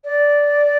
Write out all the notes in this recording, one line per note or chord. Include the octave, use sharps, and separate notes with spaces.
D5